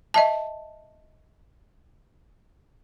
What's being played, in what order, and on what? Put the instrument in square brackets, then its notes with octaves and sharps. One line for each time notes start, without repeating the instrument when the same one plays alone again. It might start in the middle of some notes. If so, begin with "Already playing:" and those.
[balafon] D#5 E5 A5